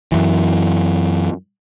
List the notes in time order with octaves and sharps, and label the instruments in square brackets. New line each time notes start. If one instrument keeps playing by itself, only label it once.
[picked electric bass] F#2 E3